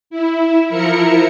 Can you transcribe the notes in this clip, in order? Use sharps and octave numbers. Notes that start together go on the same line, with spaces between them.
E4
F3 E4 A#4 C#7